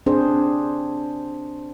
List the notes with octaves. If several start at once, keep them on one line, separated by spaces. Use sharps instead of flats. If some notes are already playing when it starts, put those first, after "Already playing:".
C4 D4 G#4 C5